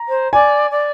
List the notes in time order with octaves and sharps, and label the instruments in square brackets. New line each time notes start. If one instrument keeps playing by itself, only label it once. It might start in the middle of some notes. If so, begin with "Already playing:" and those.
Already playing: [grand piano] A#5
[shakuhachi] C5
[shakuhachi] D5 [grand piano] G#5
[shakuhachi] D5